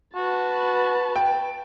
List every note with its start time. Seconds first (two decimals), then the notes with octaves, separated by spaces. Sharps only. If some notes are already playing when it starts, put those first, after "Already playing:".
0.15 F#4 B4 A5
1.16 G5